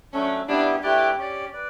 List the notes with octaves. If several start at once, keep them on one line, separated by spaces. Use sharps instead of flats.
F#3 A3 C#4 D4 A4
G3 B3 D4 E4 G4
A3 E4 G4 B4 D5
C#4 G4 D5
B4 D5